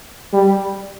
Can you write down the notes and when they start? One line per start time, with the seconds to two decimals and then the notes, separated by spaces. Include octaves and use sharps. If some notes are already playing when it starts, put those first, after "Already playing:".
0.33 G3